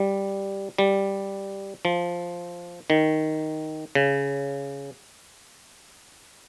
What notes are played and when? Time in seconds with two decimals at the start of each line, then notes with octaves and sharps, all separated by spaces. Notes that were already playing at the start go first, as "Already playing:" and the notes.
Already playing: G3
0.78 G3
1.85 F3
2.90 D#3
3.95 C#3